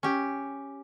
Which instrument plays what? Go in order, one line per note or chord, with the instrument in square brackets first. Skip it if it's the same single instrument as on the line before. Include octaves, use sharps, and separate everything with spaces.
[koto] C#4 G4